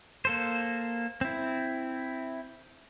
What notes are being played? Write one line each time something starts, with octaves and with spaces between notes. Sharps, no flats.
A#3 A4 C5
C4 E4